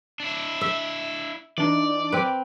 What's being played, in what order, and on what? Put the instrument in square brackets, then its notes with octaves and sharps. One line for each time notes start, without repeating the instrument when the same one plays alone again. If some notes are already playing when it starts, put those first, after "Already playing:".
[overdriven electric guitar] D4 E4
[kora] E5
[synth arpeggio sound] E3 D4 D#4 [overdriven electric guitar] D5
[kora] C4 B4